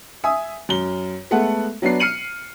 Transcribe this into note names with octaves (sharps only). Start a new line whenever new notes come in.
E5 G#5 D#6
F#2 G7
G#3 A3 B3 A4 F#5
F#3 B3 D4 C7
F6 C7 C#7 D#7 F#7